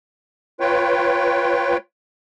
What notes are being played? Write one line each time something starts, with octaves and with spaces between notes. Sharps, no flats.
F4 B4 C#5 G5